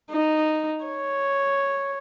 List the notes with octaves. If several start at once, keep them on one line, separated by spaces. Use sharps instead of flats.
D#4
C#5